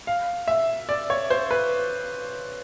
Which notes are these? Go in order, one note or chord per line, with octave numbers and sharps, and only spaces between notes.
F5
E5
D5
C#5
C5
B4